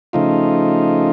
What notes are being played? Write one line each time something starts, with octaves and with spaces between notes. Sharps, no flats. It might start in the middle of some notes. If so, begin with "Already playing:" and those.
C#3 F3 A3 D#4 F4